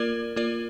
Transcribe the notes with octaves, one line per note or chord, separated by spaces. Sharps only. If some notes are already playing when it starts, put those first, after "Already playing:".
Already playing: A#3 F4 A#4 D5
A#3 F4 A#4 D5